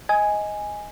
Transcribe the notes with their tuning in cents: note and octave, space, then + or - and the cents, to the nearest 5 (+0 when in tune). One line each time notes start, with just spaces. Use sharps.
D#5 +10 G#5 +0